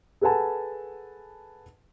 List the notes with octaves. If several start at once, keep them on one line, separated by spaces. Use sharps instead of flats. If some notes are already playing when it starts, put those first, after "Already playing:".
G#4 A4 B4 F#5 G#5 A5